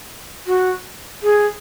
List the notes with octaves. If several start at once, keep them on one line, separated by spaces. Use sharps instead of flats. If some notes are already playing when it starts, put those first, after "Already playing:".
F#4
G#4